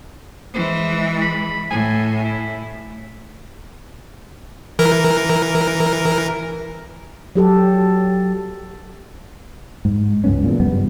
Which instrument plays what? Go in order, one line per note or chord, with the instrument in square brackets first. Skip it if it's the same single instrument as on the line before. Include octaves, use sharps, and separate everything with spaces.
[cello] E3 G#3 [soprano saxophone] C5
[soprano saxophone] B5
[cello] A2 [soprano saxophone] G#5
[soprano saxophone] E4
[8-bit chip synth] E3 A#4
[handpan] F#3 G4 A4
[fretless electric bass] G#2
C#2 G2 B3 C#4
E2 A#2
F#1 G2 G3 B3